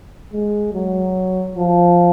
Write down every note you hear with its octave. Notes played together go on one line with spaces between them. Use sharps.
G#3
F#3
F3